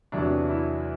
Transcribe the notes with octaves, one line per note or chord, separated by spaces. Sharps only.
E2 C3 F#3 A3 D4
E4